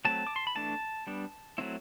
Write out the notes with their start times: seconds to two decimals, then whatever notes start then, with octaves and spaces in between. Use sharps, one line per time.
0.05 F#3 A3 C4 A5
0.27 D6
0.36 C6
0.47 B5
0.55 E3 A3 D4 A5
1.07 G3 B3 D4
1.58 F#3 A3 C4 E4